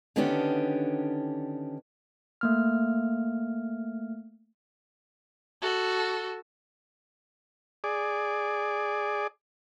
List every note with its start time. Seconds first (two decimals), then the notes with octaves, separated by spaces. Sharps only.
0.16 D3 D#3 B3 C#4 D4 G4
2.41 A3 A#3 F6
5.62 F#4 A4
7.84 G#4 D5